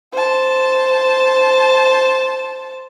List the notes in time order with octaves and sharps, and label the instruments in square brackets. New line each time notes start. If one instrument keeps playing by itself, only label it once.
[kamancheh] C5 A5